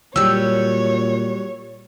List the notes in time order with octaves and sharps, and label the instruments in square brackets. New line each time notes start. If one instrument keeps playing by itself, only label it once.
[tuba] A#2 [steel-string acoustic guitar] F#3 G3 [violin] C#5 [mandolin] E6 G6